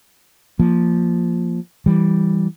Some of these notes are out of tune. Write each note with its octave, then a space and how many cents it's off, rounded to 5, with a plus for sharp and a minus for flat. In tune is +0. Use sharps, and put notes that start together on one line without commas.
F3 +0 A#3 +0
E3 +0 G3 +0